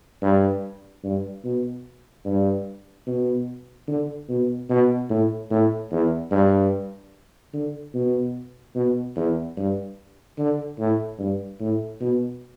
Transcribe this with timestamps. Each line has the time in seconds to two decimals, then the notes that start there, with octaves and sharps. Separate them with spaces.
0.22 G2
1.04 G2
1.44 B2
2.25 G2
3.07 B2
3.88 D3
4.29 B2
4.70 B2
5.10 A2
5.50 A2
5.91 E2
6.31 G2
7.53 D3
7.94 B2
8.75 B2
9.16 E2
9.57 G2
10.38 D3
10.79 A2
11.19 G2
11.60 A2
12.01 B2